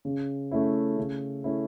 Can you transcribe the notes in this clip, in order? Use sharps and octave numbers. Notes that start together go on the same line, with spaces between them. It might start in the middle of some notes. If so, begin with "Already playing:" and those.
C#3
A3 C#4 E4
C#3
A3 C#4 E4